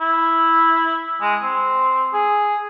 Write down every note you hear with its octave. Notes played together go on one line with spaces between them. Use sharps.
E4
G#3
C4
G#4